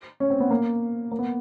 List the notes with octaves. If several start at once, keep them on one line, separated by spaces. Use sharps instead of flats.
C#4
C4
B3
A#3
A#3
B3